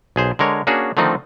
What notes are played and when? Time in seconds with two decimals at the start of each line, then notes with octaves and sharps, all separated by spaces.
0.16 B1 G#4 C5
0.39 D3 G#3 A#4 C#5
0.67 A#3 C#4 D4 F#4 G#4
0.97 D3 D#3 F3 A3 C4 D#4